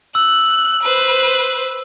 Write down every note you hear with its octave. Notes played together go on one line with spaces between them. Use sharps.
E6 F#6
B4 C5